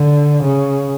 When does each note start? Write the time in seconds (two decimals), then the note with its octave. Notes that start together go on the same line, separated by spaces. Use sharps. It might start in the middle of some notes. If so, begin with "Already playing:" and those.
Already playing: D3
0.43 C#3